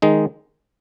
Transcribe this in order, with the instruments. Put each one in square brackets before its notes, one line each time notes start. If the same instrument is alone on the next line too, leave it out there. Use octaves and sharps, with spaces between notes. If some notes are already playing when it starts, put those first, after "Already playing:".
[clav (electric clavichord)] D#3 G#3 D#4